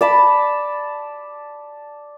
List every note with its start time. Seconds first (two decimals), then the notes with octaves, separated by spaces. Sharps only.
0.01 D5 A5 B5